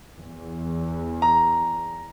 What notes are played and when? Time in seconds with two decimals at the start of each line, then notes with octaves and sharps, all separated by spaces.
0.18 E2
1.22 A#5